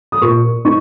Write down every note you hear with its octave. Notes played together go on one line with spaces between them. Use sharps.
D#6
A#2 C#6
D#4 C#6